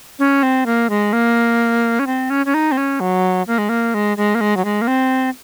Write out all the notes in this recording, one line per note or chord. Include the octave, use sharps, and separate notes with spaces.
C#4
C4
A#3
G#3
A#3
C#4
C4
C#4
C#4
D#4
C4
C#4
F#3
A#3
G#3
A#3
G#3
G#3
A#3
G#3
F#3
G#3
A#3
C4